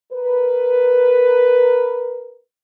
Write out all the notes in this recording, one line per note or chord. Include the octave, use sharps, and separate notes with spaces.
A#4 B4